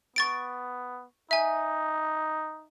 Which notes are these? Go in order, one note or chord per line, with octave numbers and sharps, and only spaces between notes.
B3 C#6 A6 D7
D#4 E5 G#5